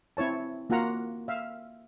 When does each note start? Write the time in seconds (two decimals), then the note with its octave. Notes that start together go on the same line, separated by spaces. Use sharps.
0.17 C4 E4 C#5 A5
0.70 A#3 F4 F#4 F#5 A#5
1.28 E5 F5